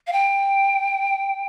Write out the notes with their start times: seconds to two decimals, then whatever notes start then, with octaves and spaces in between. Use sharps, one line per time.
0.07 F5
0.13 G5